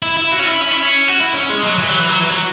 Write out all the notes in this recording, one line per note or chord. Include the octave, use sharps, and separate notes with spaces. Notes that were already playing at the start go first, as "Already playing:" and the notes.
E4
E4
F#4
C#4
E4
C#4
E4
C#4
F#4
E4
C#4
G#3
F#3
E3
F#3
E3
F#3
E3
F#3